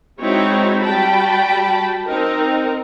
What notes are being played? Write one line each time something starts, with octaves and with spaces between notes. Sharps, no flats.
G#3 C4 D#4 E4 F#4 C#5
G3 F#4 G5 A5 B5
C4 D#4 A#4